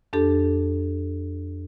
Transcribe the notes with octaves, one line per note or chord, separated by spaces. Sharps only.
F2 D4 G4 A4